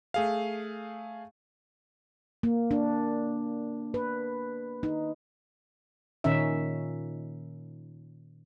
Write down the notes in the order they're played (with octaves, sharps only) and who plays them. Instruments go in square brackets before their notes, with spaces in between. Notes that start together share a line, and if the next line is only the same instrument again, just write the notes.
[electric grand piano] A3 G#4 F5
[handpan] A#3
D4
B4
D#4
A#2 D#3 C#4 D#4 E5